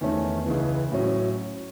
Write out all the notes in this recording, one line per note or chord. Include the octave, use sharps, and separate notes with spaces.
E2 D#3 A3 C#4
C#2 C#3 E3
A2 F#3 C#4